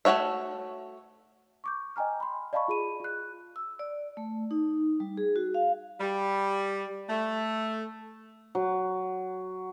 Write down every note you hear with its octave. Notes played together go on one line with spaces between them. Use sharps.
A3 D4 F#4 C#5 E5
C#6 D6 G6
D#5 G5 G#5 A#5 F6
B5 C6
D5 D#5 F5 A5 B5 C#6
F4 G#4 B5 D#7
F4 F#6
E6
D5
A3
D#4
G3
G#4
F#4
F5
G3
A3
F#3